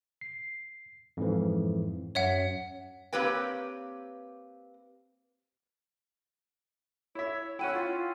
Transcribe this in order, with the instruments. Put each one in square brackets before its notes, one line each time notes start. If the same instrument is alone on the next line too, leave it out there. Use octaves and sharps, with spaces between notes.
[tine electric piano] C7
F2 G#2 E3
[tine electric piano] F#2 [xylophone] C#5 E5 F#5
[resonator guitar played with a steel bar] A#3 C4 G4 B4 C#5 G5
[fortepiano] E4 E5 [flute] C#5
[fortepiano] C#4 E4 [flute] F#5 [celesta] G5 E6 D#7
[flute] F4